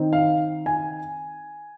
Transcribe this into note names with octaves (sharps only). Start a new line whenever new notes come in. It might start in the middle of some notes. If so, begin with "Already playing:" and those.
Already playing: D#3 C4 D#4
F5
G#5